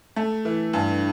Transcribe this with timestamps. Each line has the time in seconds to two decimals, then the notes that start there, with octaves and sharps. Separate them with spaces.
0.16 A3
0.45 E3
0.73 G2